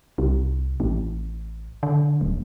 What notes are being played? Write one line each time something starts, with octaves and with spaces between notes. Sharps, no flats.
C2
A1
D3
D#1